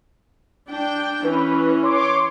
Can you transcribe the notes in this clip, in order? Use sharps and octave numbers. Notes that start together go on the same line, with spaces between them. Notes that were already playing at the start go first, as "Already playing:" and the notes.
D4 G5
E3 C#4 B4
C#5 C6 D6